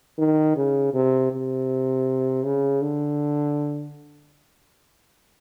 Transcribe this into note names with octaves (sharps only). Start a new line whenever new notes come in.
D#3
C#3
C3
C3
C#3
D3